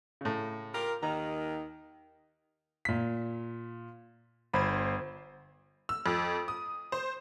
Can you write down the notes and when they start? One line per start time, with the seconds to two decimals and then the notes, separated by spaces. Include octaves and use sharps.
0.21 A2 C#3
0.73 F4 G4 A#4
1.03 D#2 D#3 A#5
2.85 A#2 B6
4.54 G1 C5 B5 G#6
5.89 E6
6.06 F2
6.48 D#6
6.92 C5